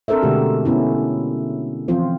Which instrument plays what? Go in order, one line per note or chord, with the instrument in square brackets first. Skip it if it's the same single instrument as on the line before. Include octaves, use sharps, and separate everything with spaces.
[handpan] C4 D4 A4 A#4 C5 E5
B2 D3 G#3 A3 F#4 G4
B3 C#4 E4
E3 F3 C4 F4 C5